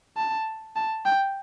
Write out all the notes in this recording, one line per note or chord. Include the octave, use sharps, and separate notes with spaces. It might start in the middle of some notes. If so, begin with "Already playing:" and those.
A5
A5
G5